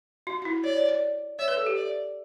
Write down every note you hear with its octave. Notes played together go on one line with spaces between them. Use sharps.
F#4
F#4
E4
C#5 D5
C#5
D5
C#5 E5
B4
A4
G4
D5